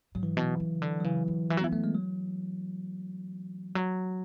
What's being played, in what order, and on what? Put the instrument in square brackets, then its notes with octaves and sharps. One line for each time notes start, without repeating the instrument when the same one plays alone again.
[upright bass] G#2 [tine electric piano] F#3
[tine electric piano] E3
[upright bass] B2 [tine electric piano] E3
[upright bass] C#3
D3
[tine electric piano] F#3
[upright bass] C#3 [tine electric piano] E3
[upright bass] D3
E3
F#3
[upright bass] E3 [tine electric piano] B3
[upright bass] E3 [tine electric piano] A3
[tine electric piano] G#3
F#3
[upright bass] F#3